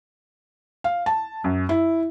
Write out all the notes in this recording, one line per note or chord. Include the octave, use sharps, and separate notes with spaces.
F5
A5
F#2
E4